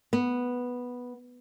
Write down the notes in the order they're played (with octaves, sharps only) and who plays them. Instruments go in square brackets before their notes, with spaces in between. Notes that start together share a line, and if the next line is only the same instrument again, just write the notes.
[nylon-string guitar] B3